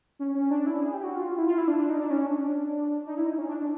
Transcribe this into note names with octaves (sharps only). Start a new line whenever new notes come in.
C#4
C#4
D4
E4
G#4
G4
F#4
F4
E4
F4
E4
D4
D4
D#4
D4
C#4
D4
D#4
E4
D#4
C#4
D4
D4